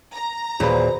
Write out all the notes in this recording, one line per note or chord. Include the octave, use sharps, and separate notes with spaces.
A#5
D#2 A#2 F#4 G#4 B4 C5 B5